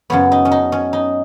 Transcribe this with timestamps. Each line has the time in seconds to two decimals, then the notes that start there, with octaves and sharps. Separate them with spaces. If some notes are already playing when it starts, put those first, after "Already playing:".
0.10 F#2 C#3 F#3 B3 C#5
0.32 D#4
0.45 C#4
0.52 D#4
0.72 C#4
0.93 D#4